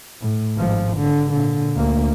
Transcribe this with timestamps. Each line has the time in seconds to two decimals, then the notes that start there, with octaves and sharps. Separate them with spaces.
0.21 A2
0.57 G#1 F3
0.98 D3
1.30 A#2 D3
1.76 D2 A#3